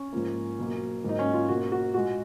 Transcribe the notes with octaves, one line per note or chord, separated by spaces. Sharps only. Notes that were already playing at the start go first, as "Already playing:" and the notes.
Already playing: C#4
G#2 F3 A#3
B2 F#3 A#3
G#2 F#3 A#3 D#4
C#4
F4
B2 A#3 F#4
F#4
A#2 G#3 F#4